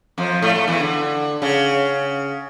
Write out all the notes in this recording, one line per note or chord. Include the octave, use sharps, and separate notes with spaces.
F2 F3
A2 A3
A2 A3
E2 E3
D3
C#3